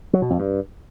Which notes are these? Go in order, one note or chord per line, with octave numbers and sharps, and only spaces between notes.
F#3
B2
F2
G2